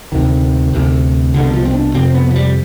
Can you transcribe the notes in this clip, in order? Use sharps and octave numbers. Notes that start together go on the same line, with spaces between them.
D2 C3 D#3
D2 C3
C2 B2 D3
F3
C4
D4
F2 C3 C4
B3
F3
G3